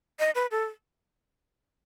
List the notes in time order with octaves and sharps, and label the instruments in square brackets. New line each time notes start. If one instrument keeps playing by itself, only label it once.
[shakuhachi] D#5
B4
A4